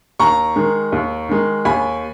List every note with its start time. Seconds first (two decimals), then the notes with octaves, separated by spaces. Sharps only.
0.19 D#2 A#5 C#6
0.56 D#3 G#3
0.92 D#2
1.29 D#3 G#3
1.65 D#2 G#5 B5